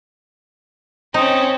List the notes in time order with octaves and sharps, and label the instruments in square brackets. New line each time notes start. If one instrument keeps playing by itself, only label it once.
[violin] C4 C#4 [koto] D#4